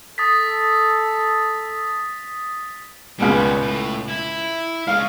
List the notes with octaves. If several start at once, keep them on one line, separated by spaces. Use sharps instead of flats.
A4 D#6 A6 B6
C#2 B2 G3 G#3 C#5
A2
E4
G#3 C#5 F5